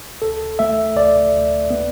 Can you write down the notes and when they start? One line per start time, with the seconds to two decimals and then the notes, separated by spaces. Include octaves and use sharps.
0.22 D2 A4
0.59 A3 E5
0.96 D2 D5
1.34 D2
1.70 B3